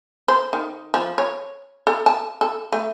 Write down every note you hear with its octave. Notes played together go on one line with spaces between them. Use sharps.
C5
D#3
F3
C#5
A4
A5
A4
A3